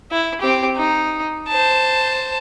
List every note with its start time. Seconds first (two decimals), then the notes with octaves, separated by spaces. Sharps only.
0.11 E4
0.41 C4 G4
0.76 D#4
1.48 C5 A5